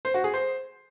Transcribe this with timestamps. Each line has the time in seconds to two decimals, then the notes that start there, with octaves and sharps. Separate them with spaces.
0.05 C5
0.14 F#4
0.24 G#4
0.34 C5